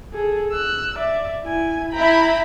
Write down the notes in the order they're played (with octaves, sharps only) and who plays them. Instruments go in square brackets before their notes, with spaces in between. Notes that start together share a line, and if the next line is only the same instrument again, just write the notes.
[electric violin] G#4 A4
E6 F#6
D5 E5
E4 G#5
[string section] E4 B5 [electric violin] G5 A#5